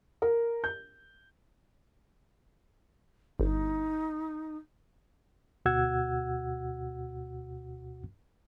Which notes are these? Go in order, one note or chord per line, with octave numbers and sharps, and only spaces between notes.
A#4
G6
G1 D#4
D2 B2 F#4 F#5 E6 G#6